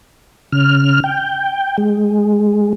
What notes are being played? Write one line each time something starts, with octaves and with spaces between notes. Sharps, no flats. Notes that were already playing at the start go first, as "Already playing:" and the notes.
C#3 F6
G5
G#3